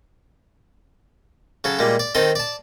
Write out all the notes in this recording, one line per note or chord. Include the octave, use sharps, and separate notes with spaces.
C#3 F#3 A4
A#2 G3 G#3
D5
D#3 C4 A4 D#5
D5 A5